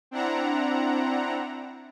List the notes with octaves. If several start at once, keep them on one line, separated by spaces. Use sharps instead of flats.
C4 D4 E4 F#5 A#5